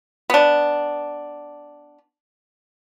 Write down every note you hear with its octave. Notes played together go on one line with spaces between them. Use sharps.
B3 D4